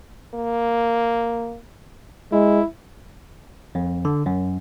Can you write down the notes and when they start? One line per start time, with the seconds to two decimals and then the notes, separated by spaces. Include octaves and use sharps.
0.34 A#3
2.32 G#3 E4
3.75 F2
4.05 D3
4.26 F#2